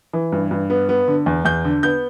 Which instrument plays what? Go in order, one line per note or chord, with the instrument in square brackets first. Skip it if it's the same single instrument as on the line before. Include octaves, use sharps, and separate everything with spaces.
[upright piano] E3
G2
G2
B3
B3
D3
E2
E2 G6
D3
B3 G6